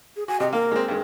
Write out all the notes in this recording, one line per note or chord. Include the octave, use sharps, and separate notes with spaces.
G#4
F#4 G#5
C3 D#5
A#3 A#4 F5
G#3 C4
G2 G#3